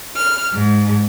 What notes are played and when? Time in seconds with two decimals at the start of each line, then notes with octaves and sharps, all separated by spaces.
0.17 F6
0.54 G#2